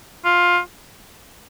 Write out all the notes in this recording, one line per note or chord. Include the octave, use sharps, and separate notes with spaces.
F4